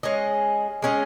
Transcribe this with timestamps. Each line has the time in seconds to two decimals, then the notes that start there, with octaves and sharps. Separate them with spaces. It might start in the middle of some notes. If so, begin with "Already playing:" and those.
0.03 G#3 C#4 G#4 D#5
0.82 G#3 C#4 G#4 D#5